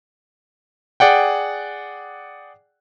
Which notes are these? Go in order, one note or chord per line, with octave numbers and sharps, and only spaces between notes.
G#4 D5 F#5 G5